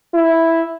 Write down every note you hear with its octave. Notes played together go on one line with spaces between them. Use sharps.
E4